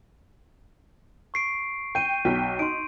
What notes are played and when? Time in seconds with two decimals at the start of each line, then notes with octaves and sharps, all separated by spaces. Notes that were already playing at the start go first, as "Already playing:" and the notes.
1.34 C#6 C7 D7
1.95 G5 G6 D#7
2.25 B1 G5 B6
2.59 D#4 C6 D7